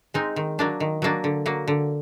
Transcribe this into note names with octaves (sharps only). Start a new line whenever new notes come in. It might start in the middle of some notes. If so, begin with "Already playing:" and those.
G#3 C4 D#4
D#3
F#3 A#3 D4
D#3
F#3 A#3 D4
D3
F#3 A#3
D3